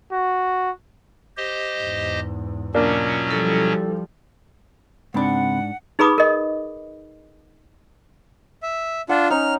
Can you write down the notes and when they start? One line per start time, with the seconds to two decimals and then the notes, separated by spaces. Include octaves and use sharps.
0.12 F#4
1.37 G4 C5 D#5
1.78 E2 G#2
2.75 B2 F#3 A#3 C#4 D4 F4
3.28 F3 G3 E4 A4
5.14 C#2 G#2 C4 D4 F#5 B5
5.99 D#4 G#4 B4 B5 D6 D#6
6.18 A#4 D#5
8.63 E5
9.09 D4 F4 F#5
9.30 C#4 D#4 F6